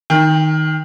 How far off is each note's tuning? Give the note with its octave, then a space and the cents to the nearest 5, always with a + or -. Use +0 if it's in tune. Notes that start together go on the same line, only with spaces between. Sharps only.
D#3 +0 G5 +25